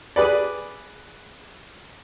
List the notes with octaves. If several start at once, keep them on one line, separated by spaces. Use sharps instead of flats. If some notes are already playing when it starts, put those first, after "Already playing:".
G#4 B4 D5